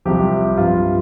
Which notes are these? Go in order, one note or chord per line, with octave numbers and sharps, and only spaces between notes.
C2 C3 F3 G4
G2 F3 F4